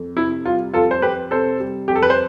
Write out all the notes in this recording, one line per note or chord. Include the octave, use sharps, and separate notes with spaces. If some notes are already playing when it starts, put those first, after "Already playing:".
Already playing: F2
C3 E4
G3 F4
F2 F4 A4
C5
F2 G4 B4
C3 A4 C5
G3
F2 G4
A4
B4
C5